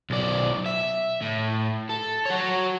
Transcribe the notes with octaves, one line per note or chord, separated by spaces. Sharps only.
B1 D5
E5
A2
A4
F#4 C#5